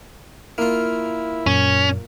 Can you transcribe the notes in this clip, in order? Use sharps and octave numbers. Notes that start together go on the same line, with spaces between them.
A#3 E4 F4
F#2 A#2 C#4